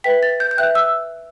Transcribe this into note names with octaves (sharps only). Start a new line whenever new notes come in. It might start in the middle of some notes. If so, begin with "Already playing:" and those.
B4 E5 G5 B6
A6
G6
G6
B4 E5 G5 F#6
E6